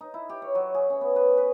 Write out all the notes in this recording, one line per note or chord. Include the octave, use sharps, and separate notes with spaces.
D#4
E4
G4
C#5
F#3
G#4
C#4
B3
B4
B4